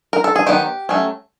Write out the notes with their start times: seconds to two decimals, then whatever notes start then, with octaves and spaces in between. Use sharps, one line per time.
0.13 A#4
0.24 A4
0.36 G#4
0.46 D#3 F#3 B3 G4
0.89 F#3 A3 C#4